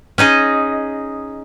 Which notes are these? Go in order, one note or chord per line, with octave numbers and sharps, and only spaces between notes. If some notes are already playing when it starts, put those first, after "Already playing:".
C#4 D#4 G#4 D#5